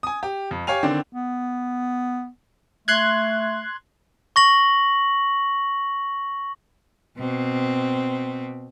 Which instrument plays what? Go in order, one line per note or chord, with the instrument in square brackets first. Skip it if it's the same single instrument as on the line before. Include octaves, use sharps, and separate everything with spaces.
[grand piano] G#5 D#6
G4
F2
G4 C#5 F5 G#5 F7
D3 D#3 C4 D5
[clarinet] B3
[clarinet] A3 [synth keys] C6 F#6 G#6
[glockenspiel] C#6 A#6 F#7
[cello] B2 C4